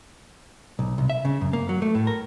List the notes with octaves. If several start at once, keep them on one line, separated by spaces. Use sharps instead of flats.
B1
C2
E5
C#3
F#2
A#3
F#3
A3
A2
A#4